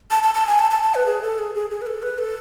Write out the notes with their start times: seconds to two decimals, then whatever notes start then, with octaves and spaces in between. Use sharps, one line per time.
0.11 A5
0.23 A5
0.34 A5
0.47 G#5
0.59 A5
0.71 A5
0.83 A5
0.95 B4
1.06 G#4
1.22 A4
1.38 G#4
1.55 G#4
1.70 G#4
1.81 B4
1.86 A4
2.02 B4
2.18 A4